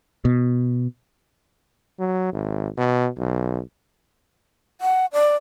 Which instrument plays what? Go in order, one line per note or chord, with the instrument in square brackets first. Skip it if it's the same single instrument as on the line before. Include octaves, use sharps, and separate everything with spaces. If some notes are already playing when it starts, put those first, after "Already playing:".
[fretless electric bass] B2
[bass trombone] F#3
G#1
B2
B1
[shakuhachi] F#5
D5